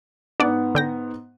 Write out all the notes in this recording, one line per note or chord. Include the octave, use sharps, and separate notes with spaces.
G#2 B3 D4 D5 F#5
D3 G5 A#6